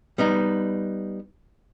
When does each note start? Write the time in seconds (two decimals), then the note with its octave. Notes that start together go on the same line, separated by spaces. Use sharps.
0.18 G3 B3 D#4